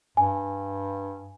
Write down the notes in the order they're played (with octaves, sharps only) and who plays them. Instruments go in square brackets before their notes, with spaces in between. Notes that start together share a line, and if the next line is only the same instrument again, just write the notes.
[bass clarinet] G2 [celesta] G#5